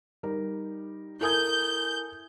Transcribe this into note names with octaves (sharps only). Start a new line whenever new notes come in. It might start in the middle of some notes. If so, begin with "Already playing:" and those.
G3 D#4 A#4
E4 A4 A#4 G#5 D#6 G6 G#6